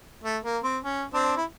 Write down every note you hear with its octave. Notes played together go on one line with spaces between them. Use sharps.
A3
A#3
C4
C#4
C4 D4
E4